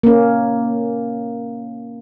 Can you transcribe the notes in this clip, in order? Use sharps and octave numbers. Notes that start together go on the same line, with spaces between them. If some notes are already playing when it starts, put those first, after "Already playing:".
A#3 C#4